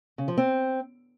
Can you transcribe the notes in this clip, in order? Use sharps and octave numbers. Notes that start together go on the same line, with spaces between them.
C#3
F3
C4